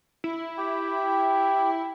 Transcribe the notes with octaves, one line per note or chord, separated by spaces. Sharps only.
E4
G4 G5